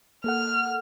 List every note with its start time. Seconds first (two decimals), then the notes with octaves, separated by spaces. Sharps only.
0.24 A#3 A4 F#5 F6